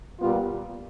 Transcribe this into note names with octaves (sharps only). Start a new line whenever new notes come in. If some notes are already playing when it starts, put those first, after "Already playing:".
A#2 G3 B3 F4